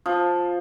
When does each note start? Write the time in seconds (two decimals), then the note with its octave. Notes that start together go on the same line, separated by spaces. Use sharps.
0.06 F3